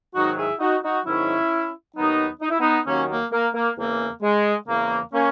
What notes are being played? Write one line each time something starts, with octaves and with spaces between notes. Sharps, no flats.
G#2 D#3 F#3 D#4 F#4
E4 G#4
D#4 F#4
D#4 F#4
G#2 D#3 F#3 C#4 E4
D#2 D#3 F#3 B3 D#4
D#4
E4
B3 D#4
D#2 D#3 F#3 A#3 C#4
A#3
A#3
A#3
E2 C#3 E3 A#3
G#3
E2 C#3 E3 A#3
A#3 C#4